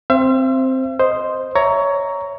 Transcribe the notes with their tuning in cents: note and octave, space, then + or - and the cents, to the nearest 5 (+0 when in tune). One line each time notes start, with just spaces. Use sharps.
C4 +0 C5 +5 E5 +45
C5 +0 D#5 +0
C#5 +15 E5 +0 A#5 +0